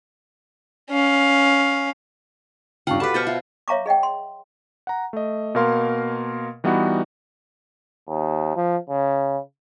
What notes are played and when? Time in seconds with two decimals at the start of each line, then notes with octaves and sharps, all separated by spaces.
0.91 C#4 F5
2.87 G2 C#3 F4 F#5 G5 A5 C#6
3.00 F#4 G4 A4 B4 F#5 A5 B5 D6
3.14 B2 C5 C#6 F6 G6 A6
3.27 F4 E5
3.68 C#5 E5 F5 A#5 C#6 D6
3.86 G#4 D#5 F#5 G5
4.03 C6
4.87 F#5 A#5
5.13 A3 D#5
5.55 B2 A#3 A#4 F5 C6
6.64 E3 G3 B3 D#4 F#4
8.08 D#2
8.56 F3
8.89 C#3